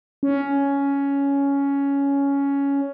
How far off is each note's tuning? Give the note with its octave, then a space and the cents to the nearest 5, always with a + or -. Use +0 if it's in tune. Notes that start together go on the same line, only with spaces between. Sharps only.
C#4 +10